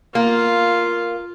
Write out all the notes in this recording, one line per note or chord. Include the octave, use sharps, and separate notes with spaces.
A#3 F4